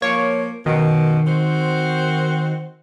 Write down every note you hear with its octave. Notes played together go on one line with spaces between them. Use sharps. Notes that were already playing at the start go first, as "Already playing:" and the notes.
F3 A#3 C#5
F#2 B2 D#3
C4 F#4 C5